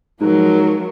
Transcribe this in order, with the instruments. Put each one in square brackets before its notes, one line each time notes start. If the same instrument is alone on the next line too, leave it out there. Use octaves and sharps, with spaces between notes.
[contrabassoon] G#2 [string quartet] F3 F#3 A#4